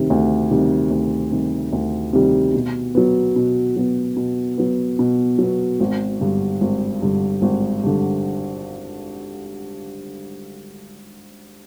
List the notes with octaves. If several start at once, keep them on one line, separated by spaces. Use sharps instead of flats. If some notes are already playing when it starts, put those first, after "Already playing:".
Already playing: D2 C3 D#3 G3
D2
C3 D#3 G3
D2
C3 D#3 G3
D2
C3 D#3 G3
B2
F#3 B3
B2
F#3 B3
B2
F#3 B3
B2
F#3 B3
G#1
G2 D3
G#1
G2 D3
G#1
G2 D3